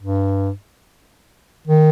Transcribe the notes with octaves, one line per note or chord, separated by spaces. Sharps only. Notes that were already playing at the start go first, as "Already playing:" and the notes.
G2
D#3